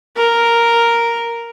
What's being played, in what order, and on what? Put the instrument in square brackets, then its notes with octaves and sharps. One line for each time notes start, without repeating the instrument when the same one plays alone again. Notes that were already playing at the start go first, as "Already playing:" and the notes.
[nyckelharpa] A#4